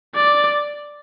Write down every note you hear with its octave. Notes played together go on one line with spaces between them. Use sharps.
D5